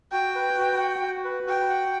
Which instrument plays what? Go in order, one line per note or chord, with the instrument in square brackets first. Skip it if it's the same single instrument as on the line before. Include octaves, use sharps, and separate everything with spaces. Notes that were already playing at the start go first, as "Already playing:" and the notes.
[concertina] F#4 [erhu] G5
[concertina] B4
F#4
F#5
F#4
B4
[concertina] F#4 [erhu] G5
[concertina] F#5